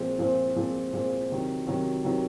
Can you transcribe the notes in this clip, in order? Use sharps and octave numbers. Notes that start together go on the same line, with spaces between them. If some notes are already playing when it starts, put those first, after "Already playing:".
Already playing: A#2 F3 G#3 C4
A#2 F3 G#3 C4
A#2 F3 G#3 C4
A#2 F3 G#3 C4
C3 D#3 F#3
C3 D#3 F#3
C3 D#3 F#3